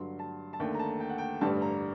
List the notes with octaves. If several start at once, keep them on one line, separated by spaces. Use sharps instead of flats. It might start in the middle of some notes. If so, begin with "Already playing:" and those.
Already playing: G2 D3 F#3 C6
A5
A5
D#2 D3 A3 G5
A#5
A5
G5
F#5
G5
A1 G2 D3 G3 A5
A#5